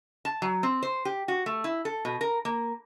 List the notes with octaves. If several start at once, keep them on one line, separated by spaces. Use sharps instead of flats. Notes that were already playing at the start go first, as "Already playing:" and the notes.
A5
F#3
C4
C5
G4
F#4
A3
E4
A4
B2
A#4
A#3